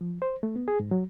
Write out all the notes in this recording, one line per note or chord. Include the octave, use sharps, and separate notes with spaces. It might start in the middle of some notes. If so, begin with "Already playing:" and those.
F3
C5
A3
B3
G#4
G#2
F#3